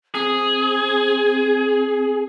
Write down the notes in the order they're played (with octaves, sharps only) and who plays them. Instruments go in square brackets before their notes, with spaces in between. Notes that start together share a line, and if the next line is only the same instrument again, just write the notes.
[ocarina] C4 [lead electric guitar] G#4